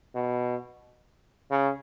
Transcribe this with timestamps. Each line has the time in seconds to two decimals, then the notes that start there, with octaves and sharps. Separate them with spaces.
0.15 B2
1.50 C#3